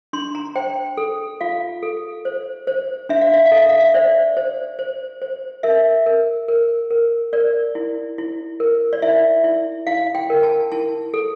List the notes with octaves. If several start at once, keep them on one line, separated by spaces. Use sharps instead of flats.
D4 C6
A#5
C5 G5
A4
F4 F5
A4
C5
C5
D4 E5
F5
E5
F5
A4
E5
F5
E5
C5 D5
C5
C5
C5
A#4 E5
A#4
A#4
A#4
A#4 D5
E4
E4
A#4
D5
E4 E5
E4
E4 F5
G5
A#4
A5
E4 A5
A4